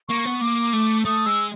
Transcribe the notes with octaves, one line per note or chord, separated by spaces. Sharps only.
A#3 C#6
B3
A#3 D6
A3
A3 D#6
G#3 E6